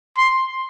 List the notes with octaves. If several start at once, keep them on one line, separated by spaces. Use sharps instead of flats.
C6